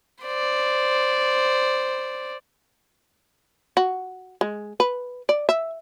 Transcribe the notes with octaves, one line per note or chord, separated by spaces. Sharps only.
C5 D5
F#4
G#3
B4
D5
E5